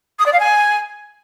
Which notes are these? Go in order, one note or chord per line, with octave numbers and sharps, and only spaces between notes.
D#6
D5
F5
G#5